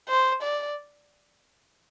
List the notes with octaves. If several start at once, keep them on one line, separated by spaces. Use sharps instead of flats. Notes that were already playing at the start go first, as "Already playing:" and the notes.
C5
D5